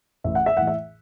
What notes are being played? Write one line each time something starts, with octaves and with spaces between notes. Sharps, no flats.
A1 E5
F#5
E5
A2 E3 F#5
E5